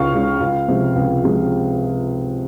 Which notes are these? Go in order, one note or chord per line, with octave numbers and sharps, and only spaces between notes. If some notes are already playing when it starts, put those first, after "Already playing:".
Already playing: C#2 C#3 G#3 C#4 F5 C#6 F6
C#3 G#3 C#4
C#2
C3 F3 G#3
C#2
C3 F3 G#3